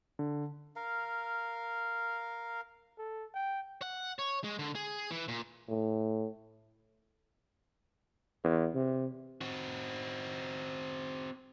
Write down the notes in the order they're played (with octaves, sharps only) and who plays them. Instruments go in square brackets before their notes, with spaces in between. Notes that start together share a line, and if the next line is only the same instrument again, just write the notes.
[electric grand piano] D3
[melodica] A#4 F5
[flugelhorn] A4
G5
[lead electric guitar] F#5
C#5
G#3
D3
G#4
E3
A#2
[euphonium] A2
[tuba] E2
C3
[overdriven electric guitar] C4 F#4